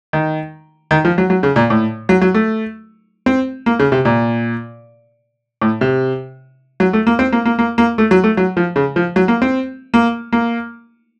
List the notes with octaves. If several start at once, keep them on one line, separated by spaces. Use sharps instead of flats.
D#3
D#3
F3
F#3
F#3
C#3
A#2
A2
F#3
F#3
A3
C4
A#3
C#3
C3
A#2
A2
C3
F#3
A3
A#3
C4
A#3
A#3
A#3
A#3
A3
F#3
A3
F#3
F3
C#3
F3
F#3
A#3
C4
A#3
A#3